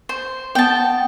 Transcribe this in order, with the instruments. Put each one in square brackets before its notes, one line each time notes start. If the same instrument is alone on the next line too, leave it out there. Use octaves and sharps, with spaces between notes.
[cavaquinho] C5
[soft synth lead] B3 [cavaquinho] G5 A5